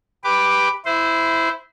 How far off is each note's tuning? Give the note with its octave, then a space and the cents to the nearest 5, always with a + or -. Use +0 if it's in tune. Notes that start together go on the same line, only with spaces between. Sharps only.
G4 +10 B4 +0 D6 +5
E4 +0 C5 -20